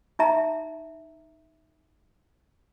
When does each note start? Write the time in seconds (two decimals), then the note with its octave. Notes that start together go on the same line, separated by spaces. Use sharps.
0.19 D#4 E5 A#5